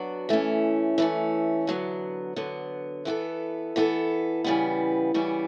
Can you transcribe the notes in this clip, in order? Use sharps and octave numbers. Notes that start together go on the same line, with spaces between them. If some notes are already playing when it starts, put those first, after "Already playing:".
Already playing: F#3 B3 D4 F#4
E3 A3 C#4
E3 A3 C#4
D3 F#3 B3
D3 F#3 B3
E3 B3 F#4 A4
E3 B3 F#4 A4
C#3 E3 G3 B3
C#3 E3 G3 B3